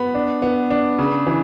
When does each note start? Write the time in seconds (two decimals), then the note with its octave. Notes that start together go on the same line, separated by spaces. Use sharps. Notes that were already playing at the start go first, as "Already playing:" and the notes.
Already playing: B3 B5
0.14 D4
0.42 B3
0.70 D4
0.99 C#3
1.26 E3